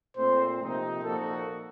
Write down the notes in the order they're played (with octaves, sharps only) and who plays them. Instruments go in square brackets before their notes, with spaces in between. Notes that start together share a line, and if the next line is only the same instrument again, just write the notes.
[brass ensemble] A#2 A3 C4 [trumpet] C5
[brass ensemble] C3 F3 A#3 D#4
[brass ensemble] A#2 F3 A#3 D#4 F#4 [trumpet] A4